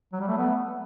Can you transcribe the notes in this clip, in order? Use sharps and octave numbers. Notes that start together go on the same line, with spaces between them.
F#3
G3
A3
B3